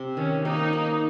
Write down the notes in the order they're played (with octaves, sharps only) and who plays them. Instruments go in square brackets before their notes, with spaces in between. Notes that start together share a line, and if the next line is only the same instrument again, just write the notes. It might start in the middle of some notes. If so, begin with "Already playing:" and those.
Already playing: [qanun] C3
[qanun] D#3 [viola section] C#4
[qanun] A#3 [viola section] D#4
[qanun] A#3